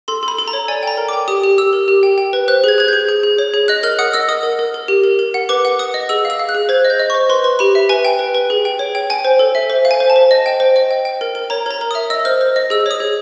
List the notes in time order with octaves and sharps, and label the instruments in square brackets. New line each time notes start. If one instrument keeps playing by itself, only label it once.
[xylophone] A4 C6
A4
B5
A4
A#5
C#5
D5 G#5
G5 A#5
A#4
D6
G5
G4 D#6
G4
G4 E6
A#4
G4
G5
G5
B4
C5 F#6
G#4 G#6
G#4 G#6
G#4 G6
G#4
G#4
C#5
G#4
D#5 F#6
A#4 F6
F#5 D#6
D#5 E6
A#4 D#6
A#4
A#4
A#4
G4
A#4
A#4
F#5
B4 D6
F#5
B4 D#6
D#5
G#4 E6
F5
E6
F5
F#6
G#4
C5 G#6
D#5
G6
D#5
C#6
C5
B4 C6
B4
G4 B5
E5
B4 G#5
G5
B4
B4
G#4
G5
C#5
G5
G5 G#5
C5
A4
E5
C5
F5
G#5
C5
A5
C5
D#5
G5
C5
D#5
G5
G5
A#4
A#4
C#5 A#5
A#4 A#5
A#4
D#6
E5
D#5 E6
C5 F6
C5
D#5
G#4 E6
C#5 D#6
G#4